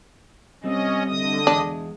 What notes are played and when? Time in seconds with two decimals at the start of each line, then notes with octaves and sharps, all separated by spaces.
0.64 G3 C4 C#4 D#5
1.08 D3 D#5 D#6
1.47 E2 G#3 D4